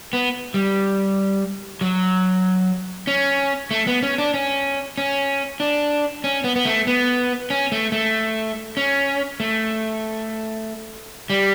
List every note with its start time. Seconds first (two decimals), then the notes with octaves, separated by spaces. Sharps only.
0.13 B3
0.54 G3
1.81 F#3
3.07 C#4
3.71 A3
3.87 B3
4.03 C#4
4.18 D4
4.34 C#4
4.98 C#4
5.60 D4
6.24 C#4
6.44 B3
6.56 B3
6.65 A3
6.87 B3
7.50 C#4
7.72 A3
7.92 A3
8.77 C#4
9.40 A3
11.30 G3